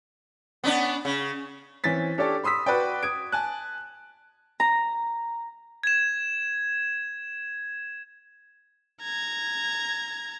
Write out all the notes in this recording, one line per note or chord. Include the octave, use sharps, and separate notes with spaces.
B3 C#4 D4
C#3
E3 C4 C#4 A6 B6
C#4 D4 G4 A4 C#5 D5
B5 C6 D#6 E6 B6
F#4 B4 D5 G5
D#6 G#6 D7
G#5 A5 F#6
A#5
G#6 E7
A#5 G#6